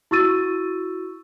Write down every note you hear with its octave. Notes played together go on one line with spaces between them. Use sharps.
E4 F#4 C#6 E6 A6 D#7